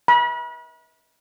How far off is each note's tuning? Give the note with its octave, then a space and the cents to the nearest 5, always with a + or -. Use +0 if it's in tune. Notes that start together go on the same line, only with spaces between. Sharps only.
B5 -40